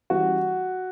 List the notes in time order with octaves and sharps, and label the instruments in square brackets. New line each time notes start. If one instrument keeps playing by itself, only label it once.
[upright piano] E3 G3 C#4 F#4